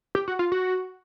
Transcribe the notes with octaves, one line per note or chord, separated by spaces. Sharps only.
G4
F#4
F4
F#4